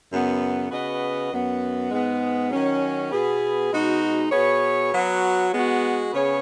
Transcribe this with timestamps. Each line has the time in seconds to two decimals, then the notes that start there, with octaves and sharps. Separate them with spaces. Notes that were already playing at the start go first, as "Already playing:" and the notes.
0.10 F#2 C#3 B3
0.70 C#3 B3 F#4 B4 D#5
1.30 F#2 F#3 B3
1.90 G#2 G#3 B3
2.50 D#3 F#3 C#4
3.10 B2 B3 G#4
3.70 B2 G#3 D#4 F#4
4.31 B2 B3 G#4 C#5
4.92 F#3 B3 F#4 C#5
5.51 G#3 B3 F#4
6.12 C#3 B3 G#4 C#5